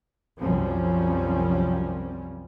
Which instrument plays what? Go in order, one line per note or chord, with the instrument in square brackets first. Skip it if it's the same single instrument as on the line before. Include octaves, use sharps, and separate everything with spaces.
[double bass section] C2 F#2 F3 G3 C4 C#4